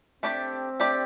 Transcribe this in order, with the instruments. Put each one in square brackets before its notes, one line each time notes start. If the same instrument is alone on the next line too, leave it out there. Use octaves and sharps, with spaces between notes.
[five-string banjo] A3 D4 G4 D5 [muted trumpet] C4
[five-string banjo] A3 D4 G4 D5